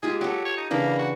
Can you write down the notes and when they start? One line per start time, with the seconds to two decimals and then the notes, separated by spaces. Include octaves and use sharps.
0.03 G#3 F4 G4 G#4
0.21 F#3 G4 A4
0.45 C#5
0.57 D#4
0.71 C#3 E3 A#3 D4
0.99 F#4